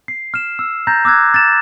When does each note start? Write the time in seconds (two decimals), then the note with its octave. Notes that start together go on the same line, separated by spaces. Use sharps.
0.08 C7
0.34 F6 E7
0.59 E6
0.87 A#5 G6 A6 A#6
1.05 D6 E6 F#6 G#6
1.34 A6 E7